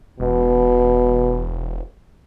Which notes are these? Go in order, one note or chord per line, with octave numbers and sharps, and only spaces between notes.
E1 B2